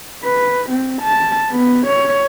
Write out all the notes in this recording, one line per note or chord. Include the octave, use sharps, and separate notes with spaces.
B4
C4
A5
B3
C#5